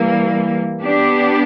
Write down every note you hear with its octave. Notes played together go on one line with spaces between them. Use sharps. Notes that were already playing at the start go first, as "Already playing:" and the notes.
Already playing: E3 G3 A#3
B3 D4 G4